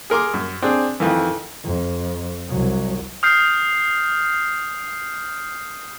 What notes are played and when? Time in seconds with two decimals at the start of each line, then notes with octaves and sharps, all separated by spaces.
0.10 G#4 A#4 C6 D6
0.34 F#2
0.62 C4 D4 G#4
1.00 F2 D#3 E3
1.64 F2
2.48 C2 F#3
3.23 D#6 F6 G6 C7